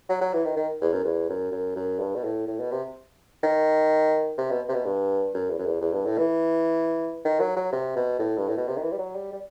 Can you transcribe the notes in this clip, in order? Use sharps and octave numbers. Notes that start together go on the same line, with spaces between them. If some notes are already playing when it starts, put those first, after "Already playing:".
F#3
F#3
E3
D#3
D#3
E2
F#2
E2
F#2
F#2
F#2
G2
B2
A2
A2
B2
C3
D#3
C3
B2
C3
B2
G2
F#2
E2
F#2
E2
E2
G2
A2
E3
D#3
F#3
F#3
C3
B2
A2
G2
A2
B2
C3
D#3
E3
G3
F#3
G3
G3